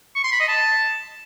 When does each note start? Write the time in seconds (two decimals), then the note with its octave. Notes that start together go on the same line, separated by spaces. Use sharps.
0.16 C#6
0.24 C6
0.32 B5
0.40 D#5
0.48 A5